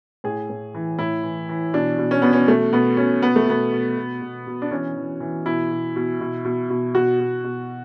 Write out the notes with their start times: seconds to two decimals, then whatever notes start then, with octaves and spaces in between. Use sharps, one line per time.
0.24 A2 G#4
0.50 A2
0.74 E3
0.99 A2 E4
1.24 E3
1.49 E3
1.73 B2 D4
1.99 B2
2.11 C#4
2.22 B2 B3
2.33 C#4
2.48 B2 A3
2.73 B2 B3
2.97 B2 C#4
3.22 B2 B3
3.36 A3
3.47 B2 B3
3.72 B2
3.97 B2
4.21 B2
4.47 B2
4.62 D4
4.71 E3 C#4
4.96 E3
5.20 E3
5.46 B2 E4
5.71 B2
5.96 B2
6.21 B2
6.45 B2
6.70 B2
6.95 B2 F#4
7.20 B2
7.44 B2